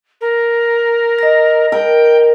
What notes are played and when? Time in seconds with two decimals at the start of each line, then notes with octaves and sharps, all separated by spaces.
0.21 A#4
1.19 D#5 A#6
1.72 A#4 G5